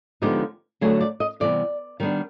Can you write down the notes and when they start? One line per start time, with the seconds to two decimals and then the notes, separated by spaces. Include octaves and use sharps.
0.22 D3 F3 G#3 B3 D#4 G4
0.81 D3 F#3 A3 D4 G#4
1.01 D5
1.20 D#5
1.40 C3 E3 G3 B3 D5
2.00 D#3 G3 B3 D4